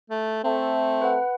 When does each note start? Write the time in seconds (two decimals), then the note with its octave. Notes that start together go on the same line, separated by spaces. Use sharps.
0.10 A3
0.44 A3 C4
1.01 B4 F#5